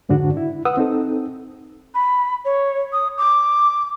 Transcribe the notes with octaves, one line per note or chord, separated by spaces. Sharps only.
F2 G#2 D3 D4 F#4
E4
B4 F#5 D#6 E6
C4 D#4 A4
B5
C#5
D#6
D6